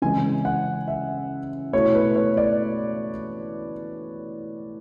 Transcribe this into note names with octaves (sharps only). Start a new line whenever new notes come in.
C#3 E3 G#3 G#5
F#5
E5
B2 A3 E4 C#5
B4
C#5
D5